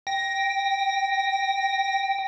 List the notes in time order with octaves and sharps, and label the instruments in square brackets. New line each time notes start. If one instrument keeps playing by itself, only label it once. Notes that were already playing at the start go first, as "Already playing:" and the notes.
[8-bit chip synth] G5 [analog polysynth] A#6